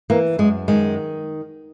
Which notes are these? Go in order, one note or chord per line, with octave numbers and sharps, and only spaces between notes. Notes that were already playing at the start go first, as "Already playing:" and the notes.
E3 A#3
F#2 G#3
D#3 G#3